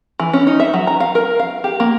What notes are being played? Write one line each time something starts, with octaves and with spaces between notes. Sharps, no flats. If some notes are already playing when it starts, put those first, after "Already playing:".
E3
C#4
D#4
E5
F#3
A#5
F5
A#4
F5
G4
A#3